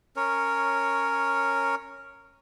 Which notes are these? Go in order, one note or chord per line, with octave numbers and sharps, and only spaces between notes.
C#4 A#4 C#5